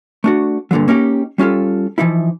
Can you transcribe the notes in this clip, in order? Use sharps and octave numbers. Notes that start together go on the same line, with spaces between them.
A3 D4 F#4
G2 A#2 D3 E3 F#3
A#3 C#4 D#4 G4
G3 C#4 F4 G4 A4
E3 F3 D#4 E4